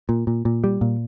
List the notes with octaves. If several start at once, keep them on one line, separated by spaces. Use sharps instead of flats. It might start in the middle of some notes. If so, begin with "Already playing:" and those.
A#2
A#2
A#2
G3
A#2